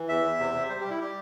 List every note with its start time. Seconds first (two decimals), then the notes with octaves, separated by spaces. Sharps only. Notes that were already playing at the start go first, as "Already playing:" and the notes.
Already playing: E3
0.09 E2 E5
0.24 E2
0.39 C3
0.55 C3
0.69 G3 C5
0.80 G4
0.85 G3
0.90 E4
1.00 G3 G4